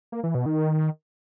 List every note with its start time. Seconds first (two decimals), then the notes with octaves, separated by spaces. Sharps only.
0.12 A#3
0.23 E3
0.35 B2
0.46 D#3